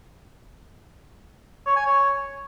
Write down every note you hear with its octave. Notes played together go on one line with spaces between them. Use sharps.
C#5
G#5
C#5